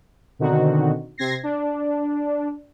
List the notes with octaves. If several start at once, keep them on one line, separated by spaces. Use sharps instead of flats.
B2 D3 D#3 C4 D#4 F#4
C3 C4 G#6 A#6 C7
D4